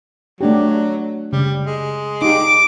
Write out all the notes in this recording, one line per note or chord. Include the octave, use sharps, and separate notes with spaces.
F#3 A3 D4 G4
C#3 G3
G#3
D#4 G4 D6